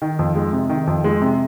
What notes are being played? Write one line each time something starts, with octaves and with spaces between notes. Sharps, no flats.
D#3
F2
G#3
C3
D#3
F2
G#3
C3